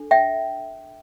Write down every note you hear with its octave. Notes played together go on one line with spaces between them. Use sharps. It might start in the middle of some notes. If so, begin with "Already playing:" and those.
Already playing: D4 A4
E5 G5